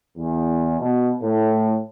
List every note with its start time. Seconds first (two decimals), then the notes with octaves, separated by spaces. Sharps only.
0.17 E2
0.80 B2
1.21 A2